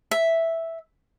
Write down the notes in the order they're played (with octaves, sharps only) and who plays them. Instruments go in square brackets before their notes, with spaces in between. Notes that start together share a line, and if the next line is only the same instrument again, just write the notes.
[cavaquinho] E5